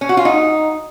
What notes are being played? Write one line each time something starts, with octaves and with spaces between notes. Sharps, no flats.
C#4
F#4
F4
D#4